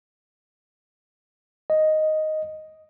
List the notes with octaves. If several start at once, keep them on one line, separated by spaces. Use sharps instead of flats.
D#5